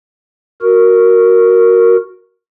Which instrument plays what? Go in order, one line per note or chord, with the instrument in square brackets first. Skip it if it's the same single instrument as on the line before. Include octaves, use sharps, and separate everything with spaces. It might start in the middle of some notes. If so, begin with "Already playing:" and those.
[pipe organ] F#4 A#4